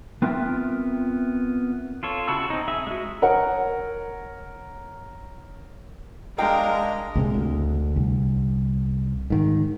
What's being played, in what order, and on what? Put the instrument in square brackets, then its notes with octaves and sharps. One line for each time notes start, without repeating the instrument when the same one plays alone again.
[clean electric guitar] B3 C4 F4 A#4 E5
[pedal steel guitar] F4 A4 C#5
C#3 E4 F#4 A5 E6
C4 D#4
G#4 E5 E6
G#3 F#4
[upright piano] A#4 C#5 F#5
[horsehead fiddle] G#3 A#4 [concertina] D4 D#5 [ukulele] F5 G5 A#5
[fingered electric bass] C#2 C3 G#3
D2
C2
G#2 D#3